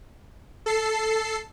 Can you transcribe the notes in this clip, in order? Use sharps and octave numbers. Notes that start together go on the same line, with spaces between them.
A4 C7